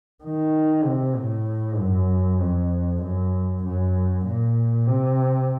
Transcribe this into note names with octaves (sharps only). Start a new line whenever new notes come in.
D#3
C3
A2
F#2
F2
F#2
F#2
A#2
C3